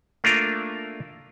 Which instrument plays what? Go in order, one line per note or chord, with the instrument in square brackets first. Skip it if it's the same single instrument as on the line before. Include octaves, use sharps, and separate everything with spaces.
[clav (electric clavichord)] A3 A#3 D4 F4 A#4